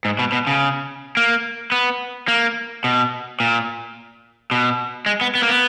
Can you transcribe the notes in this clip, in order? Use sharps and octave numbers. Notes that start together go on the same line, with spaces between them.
G#2
B2
B2
C#3
A#3
B3
A#3
B2
A#2
B2
G#3
B3
B3
A#3
B3